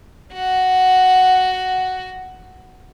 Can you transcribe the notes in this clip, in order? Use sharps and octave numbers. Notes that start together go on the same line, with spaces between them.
F#4 F#5